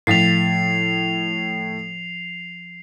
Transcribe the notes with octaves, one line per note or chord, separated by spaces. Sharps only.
A2 F3 A6 B6 C7 F7